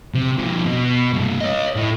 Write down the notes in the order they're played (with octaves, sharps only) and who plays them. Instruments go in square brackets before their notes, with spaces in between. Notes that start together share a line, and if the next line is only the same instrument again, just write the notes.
[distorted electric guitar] C3
F2 A#2
B2
G2 C3
C#5 D#5
A2